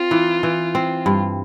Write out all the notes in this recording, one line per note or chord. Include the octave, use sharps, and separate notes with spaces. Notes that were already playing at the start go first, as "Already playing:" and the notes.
Already playing: C4 F4
E3
E3
C4
G2